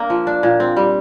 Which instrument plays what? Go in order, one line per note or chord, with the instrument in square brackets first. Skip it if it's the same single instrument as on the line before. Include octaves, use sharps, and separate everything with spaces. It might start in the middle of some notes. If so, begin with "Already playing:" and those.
Already playing: [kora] A#3 D4
F3
D4
A#2
C4
G3